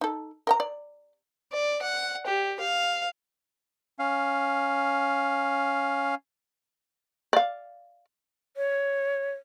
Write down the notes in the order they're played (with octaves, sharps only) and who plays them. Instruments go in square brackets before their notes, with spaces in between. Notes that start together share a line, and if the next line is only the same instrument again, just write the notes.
[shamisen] D#4 A4
A#4 G5 A#5
D5
[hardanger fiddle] D5
F#5
G4
F5
[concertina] C#4 F5
[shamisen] D5 F5
[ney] C#5